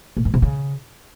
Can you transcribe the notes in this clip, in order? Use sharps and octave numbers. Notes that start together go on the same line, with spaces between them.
A#2
G2
C3
C#3